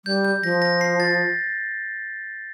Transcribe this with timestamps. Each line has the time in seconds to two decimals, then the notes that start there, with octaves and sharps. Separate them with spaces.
0.05 G3 G6
0.24 G6
0.43 F3 A#6
0.62 A#6
0.81 C7
1.00 A6